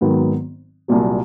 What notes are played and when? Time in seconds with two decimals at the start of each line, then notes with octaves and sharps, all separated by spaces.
0.01 G#1 G#2 D#3 F#3 B3
0.88 C2 A#2 F#3